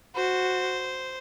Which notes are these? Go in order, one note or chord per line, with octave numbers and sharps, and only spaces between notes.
F#4 C5